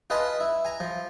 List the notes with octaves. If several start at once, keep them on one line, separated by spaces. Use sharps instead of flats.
F4 B4 D#5 G#5 A5 B5
E4
G#5 A#5
F3